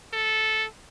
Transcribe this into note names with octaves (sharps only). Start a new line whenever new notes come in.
A4